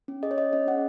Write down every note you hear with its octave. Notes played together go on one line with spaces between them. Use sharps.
C#4
G#4 D#5
C#5
G#4 D#5
C#4 D#5
C#4 F#5